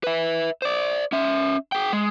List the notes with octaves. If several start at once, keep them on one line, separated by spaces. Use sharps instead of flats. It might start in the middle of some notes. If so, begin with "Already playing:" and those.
B4 E5
C5 D5
C#4 E5
G#4 G5
G#3